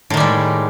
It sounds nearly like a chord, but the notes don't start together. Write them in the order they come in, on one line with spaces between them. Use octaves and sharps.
A2 D#3 G3 G#3